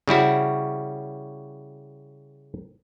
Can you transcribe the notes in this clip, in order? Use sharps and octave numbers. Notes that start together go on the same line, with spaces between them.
C#3 G3 E4 F#4